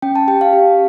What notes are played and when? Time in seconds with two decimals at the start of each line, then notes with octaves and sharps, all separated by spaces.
0.02 C#4 G5
0.16 A5
0.28 G4 G5
0.41 F5
0.53 G4